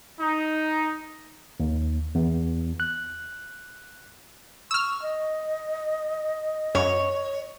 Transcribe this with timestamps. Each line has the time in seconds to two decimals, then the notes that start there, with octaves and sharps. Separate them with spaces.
0.19 D#4
1.60 D#2
2.15 E2
2.80 F#6
4.71 C#6 E6 F6
5.02 D#5
6.75 F#2 C#5